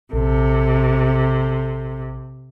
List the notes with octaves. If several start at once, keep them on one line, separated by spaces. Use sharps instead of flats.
A#1 C3 A4